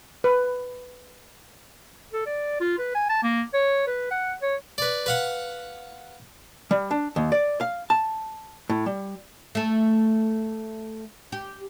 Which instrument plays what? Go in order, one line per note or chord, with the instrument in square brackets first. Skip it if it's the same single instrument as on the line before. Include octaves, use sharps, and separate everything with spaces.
[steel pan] B4
[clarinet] A4
D5
F4
B4
G#5
A5
A#3
C#5
B4
F#5
C#5
[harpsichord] B4 D5
B4 F5 F#5
[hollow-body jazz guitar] G3
D4
D#2
D5
F5
A5
A2
G3
[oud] A3 A4
G4